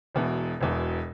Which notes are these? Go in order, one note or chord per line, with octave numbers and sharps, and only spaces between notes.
E1 E2 B2
E1 E2 B2